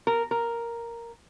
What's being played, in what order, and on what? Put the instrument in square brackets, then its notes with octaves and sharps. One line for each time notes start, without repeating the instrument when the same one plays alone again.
[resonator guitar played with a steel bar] A#4
A#4